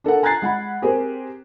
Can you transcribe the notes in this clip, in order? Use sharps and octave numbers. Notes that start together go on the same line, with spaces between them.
D4 A4 A#4 F#5
G#5 A#5 F#6 G#6 A6 C7
G#3 F#5 B5
C4 G4 G#4 A#4 C5